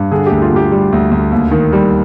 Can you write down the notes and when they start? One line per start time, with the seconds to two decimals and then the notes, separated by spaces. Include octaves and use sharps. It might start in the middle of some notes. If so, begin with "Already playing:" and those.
Already playing: G2
0.11 D3 G#4
0.27 D2 G4
0.42 F4
0.52 D2 G4
0.72 G3
0.92 D2
1.11 D2
1.32 D#2
1.51 D#3
1.73 G3